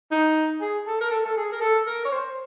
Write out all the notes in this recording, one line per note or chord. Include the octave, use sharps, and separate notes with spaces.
D#4
G#4
A4
A#4
A4
A4
G#4
A#4
A4
A#4
C#5
C5